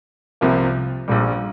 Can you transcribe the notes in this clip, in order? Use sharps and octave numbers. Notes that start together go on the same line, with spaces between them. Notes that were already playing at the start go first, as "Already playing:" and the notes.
C2 C3 F3 A#3
A#1 A#2 G3